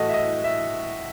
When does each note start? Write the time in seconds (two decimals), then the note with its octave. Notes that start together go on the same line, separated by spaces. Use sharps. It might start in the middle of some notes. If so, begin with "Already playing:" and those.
Already playing: A2 E3 A3 F#4 A4 D#5
0.09 E5
0.14 D#5
0.44 E5